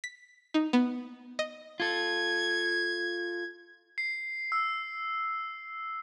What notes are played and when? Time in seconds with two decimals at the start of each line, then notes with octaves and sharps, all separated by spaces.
0.04 B6
0.54 D#4
0.73 B3
1.39 D#5
1.80 F4 A4 G#6
3.98 C7
4.52 E6